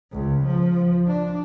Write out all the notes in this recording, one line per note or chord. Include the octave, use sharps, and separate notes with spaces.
C#2
F3
D4